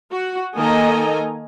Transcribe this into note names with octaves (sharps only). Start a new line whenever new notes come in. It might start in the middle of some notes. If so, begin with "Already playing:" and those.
F#4
D#3 A#3 A4 D#5 G#5 A#5